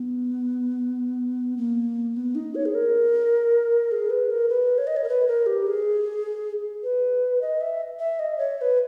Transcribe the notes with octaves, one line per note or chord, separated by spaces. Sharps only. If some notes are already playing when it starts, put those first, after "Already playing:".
Already playing: B3
A#3
B3
D#4
C#5
G#4
A#4
G#4
B4
A#4
B4
C#5
D#5
C#5
A#4
B4
A#4
G4
G#4
B4
D#5
E5
E5
D#5
C#5
C#5
B4